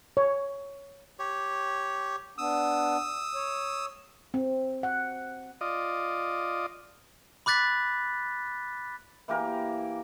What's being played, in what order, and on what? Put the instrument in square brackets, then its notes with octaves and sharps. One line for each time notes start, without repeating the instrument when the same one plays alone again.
[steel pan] C#5
[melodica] G4 C#5
[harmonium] B3 D4 [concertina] D#6 E6
[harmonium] C#5
[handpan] C4
F#5
[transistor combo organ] F4 D5 D#5
[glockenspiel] B5 D6 F#6 A6 B6
[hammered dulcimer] E3 A#3 G4 A#4